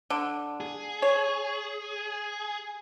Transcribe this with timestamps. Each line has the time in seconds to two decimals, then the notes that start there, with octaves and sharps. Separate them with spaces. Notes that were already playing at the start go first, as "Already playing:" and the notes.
0.10 D3
0.61 G#4
1.02 C#5